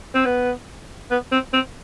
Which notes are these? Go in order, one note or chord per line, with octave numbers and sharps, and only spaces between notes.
C4
B3
B3
C4
C4